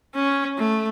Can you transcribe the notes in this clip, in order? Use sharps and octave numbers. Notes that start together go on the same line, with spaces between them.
C#4
A3